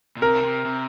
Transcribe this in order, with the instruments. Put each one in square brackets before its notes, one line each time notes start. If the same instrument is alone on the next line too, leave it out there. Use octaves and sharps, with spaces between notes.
[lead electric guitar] A#2
[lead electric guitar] C3 [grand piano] A#4
[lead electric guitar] C3
C3